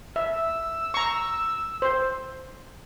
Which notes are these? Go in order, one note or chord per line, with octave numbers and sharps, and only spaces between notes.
E5 E6
A#5 C#6
C5